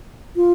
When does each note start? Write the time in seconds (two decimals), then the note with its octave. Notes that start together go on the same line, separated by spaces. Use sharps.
0.36 F4